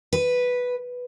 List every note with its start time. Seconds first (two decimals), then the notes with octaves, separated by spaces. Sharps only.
0.13 B4